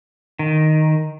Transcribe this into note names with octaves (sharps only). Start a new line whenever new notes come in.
D#3